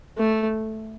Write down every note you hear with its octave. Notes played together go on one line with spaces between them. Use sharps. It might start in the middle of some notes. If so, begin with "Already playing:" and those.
A3